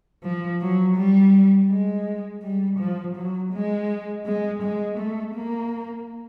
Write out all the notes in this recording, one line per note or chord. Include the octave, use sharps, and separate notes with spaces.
F3
F#3
G3
G#3
G3
F3
F#3
G#3
G#3
G#3
A3
A#3